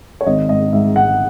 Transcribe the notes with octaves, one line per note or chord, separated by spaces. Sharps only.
C#5
G#1 D#5
G#2 D#5
G#2 E5
G#2 F#5